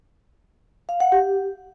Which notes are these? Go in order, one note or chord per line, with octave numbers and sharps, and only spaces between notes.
F5
F#5
G4